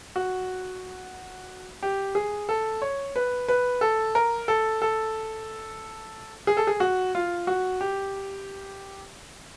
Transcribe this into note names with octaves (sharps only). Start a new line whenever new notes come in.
F#4
G4
G#4
A4
C#5
B4
B4
A4
A#4
A4
A4
G#4
A4
G#4
F#4
F4
F#4
G4